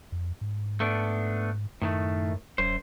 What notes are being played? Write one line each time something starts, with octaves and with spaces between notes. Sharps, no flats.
F2
G#2
A3 B3 D4
F#2 A2 D#3 A3
D#1 F#2 C5